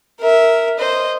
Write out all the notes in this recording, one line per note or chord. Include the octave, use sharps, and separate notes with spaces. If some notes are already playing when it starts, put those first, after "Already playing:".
A#4 E5
C5 D#5